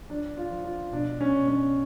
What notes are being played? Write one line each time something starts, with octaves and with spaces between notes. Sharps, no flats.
F3 D4
F4
F3
F4
B2 D4
C#4
B2
C#4